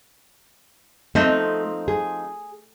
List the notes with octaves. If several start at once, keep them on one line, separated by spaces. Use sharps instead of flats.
F3 A3 C4 D#4
G#4